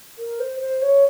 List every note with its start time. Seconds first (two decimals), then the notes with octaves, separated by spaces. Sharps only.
0.18 A#4
0.39 C5
0.60 C5
0.81 C#5